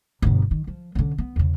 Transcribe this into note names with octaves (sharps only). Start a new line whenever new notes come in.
G1 B2
D#3
F3
D3 C#4
B3
E2 C#3